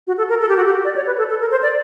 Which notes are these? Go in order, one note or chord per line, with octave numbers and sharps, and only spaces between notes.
F#4
A4
A#4
A4
G4
F#4
G4
D5
C#5
B4
A4
A4
A#4
C5
D5